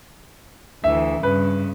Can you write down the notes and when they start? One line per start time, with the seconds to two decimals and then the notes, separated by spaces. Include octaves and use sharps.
0.84 D2 E3 E5
1.23 G2 C#3 B4